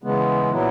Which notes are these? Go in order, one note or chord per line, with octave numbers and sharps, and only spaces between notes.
C#3 E3 G#3 B3
A#2 F#3 B3 E4